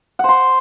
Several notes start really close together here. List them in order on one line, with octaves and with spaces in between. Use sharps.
F#5 C5 C6